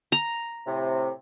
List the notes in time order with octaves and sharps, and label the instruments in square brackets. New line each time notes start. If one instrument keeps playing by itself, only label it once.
[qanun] A#5
[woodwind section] A2 C3